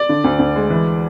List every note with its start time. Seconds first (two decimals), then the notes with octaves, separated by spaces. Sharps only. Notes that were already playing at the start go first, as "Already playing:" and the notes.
Already playing: D5
0.09 D3
0.24 D2
0.39 D2
0.56 G#3
0.70 E3